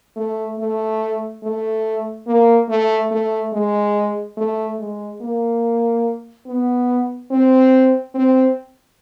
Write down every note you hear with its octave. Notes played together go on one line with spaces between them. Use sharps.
A3
A3
A3
A#3
A3
A3
G#3
A3
G#3
A#3
B3
C4
C4